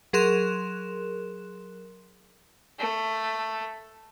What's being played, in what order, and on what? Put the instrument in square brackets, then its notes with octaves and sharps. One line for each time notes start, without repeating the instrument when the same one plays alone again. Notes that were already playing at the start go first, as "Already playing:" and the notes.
[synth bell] F#3 G#4 A#4 C6 F#6 E7
[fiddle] A3